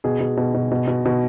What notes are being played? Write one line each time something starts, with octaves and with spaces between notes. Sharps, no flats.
B2 G#4
B2
B2
B2
B2
B2
B2